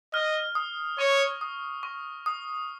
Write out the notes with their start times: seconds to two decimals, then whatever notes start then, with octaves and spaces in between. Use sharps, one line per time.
0.14 D#5 F6
0.55 D#6
0.99 C#5 C#6
1.41 D#6
1.83 C#6
2.26 D#6